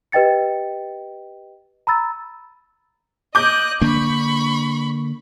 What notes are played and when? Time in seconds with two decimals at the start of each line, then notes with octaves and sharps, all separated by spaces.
0.12 G4 B4 D#5 G5 A6 C#7
1.87 A#5 B5 E6 A6
3.35 D#5 D6 F#6 G6
3.81 D3 A#3 D4 B5 C#6